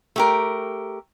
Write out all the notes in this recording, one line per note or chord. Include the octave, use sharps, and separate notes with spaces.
A3 G4 A#4